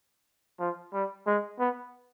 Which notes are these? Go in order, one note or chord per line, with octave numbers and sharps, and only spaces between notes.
F3
G3
G#3
B3